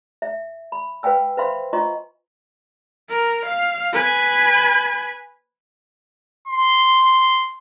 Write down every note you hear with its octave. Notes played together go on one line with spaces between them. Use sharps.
E5
B5
B4 F5 G5 G#5 E6
B4 C5 E5 F5 B5 C6
F4 D#5 G#5 A#5 C6 C#6
A#4
F5
B4 G#5
C6